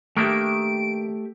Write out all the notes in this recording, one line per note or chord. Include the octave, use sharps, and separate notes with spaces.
D#3 A3 A#3 D4 G4 E5 D7